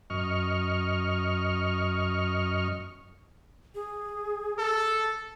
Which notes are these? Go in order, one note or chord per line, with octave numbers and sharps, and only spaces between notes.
F#2 D#5 C#6 F6
G#4
A4